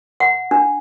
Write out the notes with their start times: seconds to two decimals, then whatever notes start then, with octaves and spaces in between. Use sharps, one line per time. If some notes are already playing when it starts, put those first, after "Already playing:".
0.20 F#5
0.51 D4